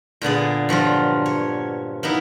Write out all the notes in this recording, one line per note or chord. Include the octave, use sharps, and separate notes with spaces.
A#2 D3 B3 G#4
G2 F3 F#3 F4
C#5
A#3 B3 D#4 E4